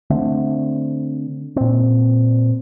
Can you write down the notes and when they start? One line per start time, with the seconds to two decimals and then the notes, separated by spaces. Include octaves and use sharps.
0.10 D3 A3 C4
1.56 A#2 C4